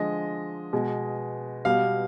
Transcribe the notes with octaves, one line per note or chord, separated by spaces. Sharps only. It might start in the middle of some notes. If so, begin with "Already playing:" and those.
Already playing: D3 F3 G#3 D#5
B2 G#3
B2 G3 F5